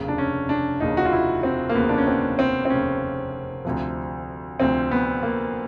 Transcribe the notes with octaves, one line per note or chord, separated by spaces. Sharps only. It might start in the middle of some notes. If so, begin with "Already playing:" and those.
Already playing: F1 D#2 C#3
D4
C#4
D4
F1 D#2 C#3 D#4
F#4
F4
E4
C4
A#3
F1 D#2 C#3 B3
D4
C#4
C4
C4
C4
F1 D#2 C#3 C#4
D2 C3 F3
D2 C3 F3 C4
B3
A#3